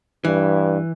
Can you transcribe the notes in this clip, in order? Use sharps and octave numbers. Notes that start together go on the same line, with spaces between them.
G2 E3